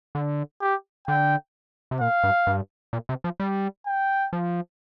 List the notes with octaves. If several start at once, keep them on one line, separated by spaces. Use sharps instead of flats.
D3
G4
D3 G5
C3
A#2 F5
G2
G2
A#2
C3
F3
G3
G5
F3